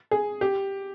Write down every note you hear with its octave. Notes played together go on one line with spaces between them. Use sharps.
G#4
G4